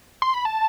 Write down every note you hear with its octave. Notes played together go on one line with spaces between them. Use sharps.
C6
B5
A5